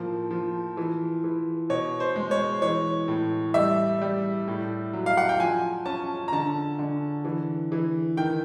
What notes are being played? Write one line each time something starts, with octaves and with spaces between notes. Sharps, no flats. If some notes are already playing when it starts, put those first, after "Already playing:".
Already playing: A2 F3 A#3
F3
E3
E3
B2 C#5
C5
G#3
C#5
E3 C#5
A2
G3 E5
G3
A2
F#3
F5
F#5
G5
F3 G#5
C#4 A5
A#5
D3 A5
D3
E3
E3
D#3 G5